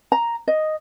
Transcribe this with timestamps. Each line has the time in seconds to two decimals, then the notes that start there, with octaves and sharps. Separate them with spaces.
0.12 A#5
0.48 D#5